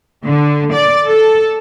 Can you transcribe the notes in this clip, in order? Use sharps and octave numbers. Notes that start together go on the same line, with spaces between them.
D3
D5
A4